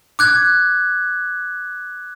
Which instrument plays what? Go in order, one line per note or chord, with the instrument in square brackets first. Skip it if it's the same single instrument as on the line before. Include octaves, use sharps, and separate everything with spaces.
[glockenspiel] D6 F#6 G#6